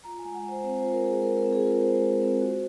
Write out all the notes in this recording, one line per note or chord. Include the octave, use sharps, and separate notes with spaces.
F4 A#5
G#5
G#3
F#5
G#3
C5
C4 C5
F4 C5
A#4
G#3 G#4
G#3 A#4
A#4
C4
G#4
F4 A#4
G#3 C5
G#3
C4
F#4